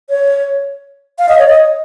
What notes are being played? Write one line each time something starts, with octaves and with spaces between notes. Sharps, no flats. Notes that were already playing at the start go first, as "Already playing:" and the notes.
C#5
F5
D#5
C#5
D#5